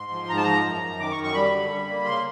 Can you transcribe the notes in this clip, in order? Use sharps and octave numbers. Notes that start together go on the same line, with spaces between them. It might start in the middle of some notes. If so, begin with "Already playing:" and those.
Already playing: G#2 C6
F3
G#2 A#5
A5
F3 A#5
F#2
F#2
D#3 D6
C#6
F#2
C#6
G3 B5
D3
G3
A#3
C#3 C6